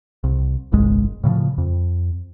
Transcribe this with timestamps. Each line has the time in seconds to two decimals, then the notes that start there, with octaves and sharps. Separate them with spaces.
0.24 C2
0.72 D1 G1 C2 G#3
1.24 A2 C#3 E3 F3
1.58 F2